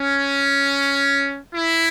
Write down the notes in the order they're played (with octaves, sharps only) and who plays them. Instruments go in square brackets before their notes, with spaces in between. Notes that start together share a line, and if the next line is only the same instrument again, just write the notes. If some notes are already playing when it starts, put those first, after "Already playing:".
Already playing: [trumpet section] C#4
E4